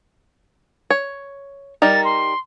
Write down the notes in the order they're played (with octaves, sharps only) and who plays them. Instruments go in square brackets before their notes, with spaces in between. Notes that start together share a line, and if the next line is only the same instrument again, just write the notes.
[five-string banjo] C#5
[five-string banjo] G3 D#4 A#4 [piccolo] A6
[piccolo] C6